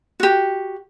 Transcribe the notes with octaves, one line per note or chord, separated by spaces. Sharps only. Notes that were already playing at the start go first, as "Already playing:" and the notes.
F#4 G4